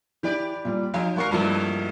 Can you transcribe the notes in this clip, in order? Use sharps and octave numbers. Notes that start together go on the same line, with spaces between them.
E3 G4 B4 D5
A#2 G3
F3 D#4 F5 G#5
G#1 A#3 F#4 A#4 C#6 C7
G2 B2 E3 F3 G#3 A#3